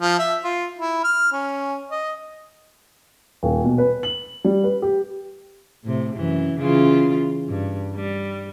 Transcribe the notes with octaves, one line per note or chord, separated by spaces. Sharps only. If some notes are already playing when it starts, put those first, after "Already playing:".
F3
E5
F4
E4
F6
C#4
D#5
D#1
B2
B4
F#7
G3
B4
G4
A2 C3
F#2 E3
C#3 E3 F4
G2
G3